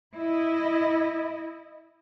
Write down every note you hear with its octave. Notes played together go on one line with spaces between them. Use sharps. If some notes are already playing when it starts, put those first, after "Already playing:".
E4 D#5